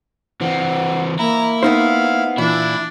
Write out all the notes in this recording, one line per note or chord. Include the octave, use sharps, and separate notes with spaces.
E3 C4 F#5
A#3 E4 A#5
B3 D#4 C5 F5
A#2 E3 D4 E4